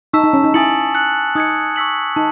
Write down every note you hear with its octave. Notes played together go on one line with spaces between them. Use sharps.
D#4 A5 C#6 E6 B6 E7
D#4
C#4
D#4
E4 G#5 D#6 A6 C#7 F#7
F#6 C#7 F#7
D#4 D#6 G#6 C#7
C#6 E6 B6 F#7
D#4 A5